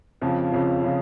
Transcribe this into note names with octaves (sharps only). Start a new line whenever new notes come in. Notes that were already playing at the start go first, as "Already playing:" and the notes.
F2 C#3 F3
F2 C#3 F3
C#3 F3